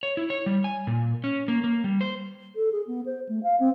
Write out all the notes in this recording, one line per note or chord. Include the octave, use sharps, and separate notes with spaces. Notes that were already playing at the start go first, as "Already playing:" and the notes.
C#5
E4
C#5
G3
G#5
A#2
C#4
A#3
A#3
G3
C5
A4
G#4
B3
C5
A3
F5
C4